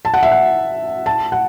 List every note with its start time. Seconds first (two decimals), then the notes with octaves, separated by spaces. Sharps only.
0.05 A5
0.14 F#5
0.23 E5
0.32 F#5
1.06 A5
1.32 F#5